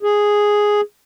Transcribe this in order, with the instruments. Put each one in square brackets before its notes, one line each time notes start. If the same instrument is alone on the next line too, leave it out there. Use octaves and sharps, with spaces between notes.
[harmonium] G#4